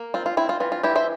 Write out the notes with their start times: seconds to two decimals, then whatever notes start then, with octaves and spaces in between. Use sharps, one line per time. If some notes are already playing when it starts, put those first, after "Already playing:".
Already playing: A#3
0.14 C4 F4
0.26 F4
0.37 C4 E4
0.49 F4
0.60 E3 F4
0.72 F4
0.83 E3 E4 G4
0.95 C5 E5